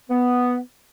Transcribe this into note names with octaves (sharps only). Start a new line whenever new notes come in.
B3